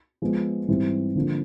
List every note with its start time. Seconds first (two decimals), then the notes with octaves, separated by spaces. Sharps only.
0.22 F3 G#3 B3
0.68 G#2 E3 G3 C4
1.15 D3 F3 A#3